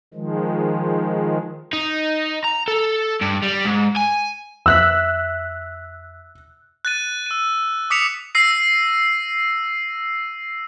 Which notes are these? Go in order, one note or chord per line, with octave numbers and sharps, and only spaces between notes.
D#3 F3 G#3
D#4
A#5
A4
G2
G3
G#2
G#5
F2 E5 E6 F#6 B6
F#6 A6 D#7
E6 D#7
D6 D#6 B6 C#7 E7 F7
E6 A#6 C7 D#7